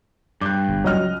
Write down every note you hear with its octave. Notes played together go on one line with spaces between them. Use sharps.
G2 D6 F#6
G1
C#2 F#3 D#5 F6